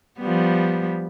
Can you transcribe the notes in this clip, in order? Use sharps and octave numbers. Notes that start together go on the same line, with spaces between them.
F3 G3 B3